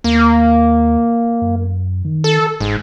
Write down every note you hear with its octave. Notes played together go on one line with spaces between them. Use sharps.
D#2 A#3
F#2
D#3
A4
G1 G#2